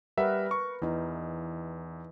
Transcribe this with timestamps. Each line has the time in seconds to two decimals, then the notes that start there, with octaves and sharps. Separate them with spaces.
0.18 G3 A#4 B4 E5 F#5
0.51 C#6
0.82 E2 E3 D#4